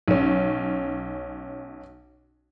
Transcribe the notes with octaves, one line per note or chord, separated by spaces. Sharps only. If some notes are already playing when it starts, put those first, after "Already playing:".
B1 C#4